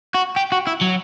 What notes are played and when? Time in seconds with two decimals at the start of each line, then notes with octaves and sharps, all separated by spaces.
0.15 F#4
0.36 G4
0.52 F#4
0.67 E4
0.81 F#3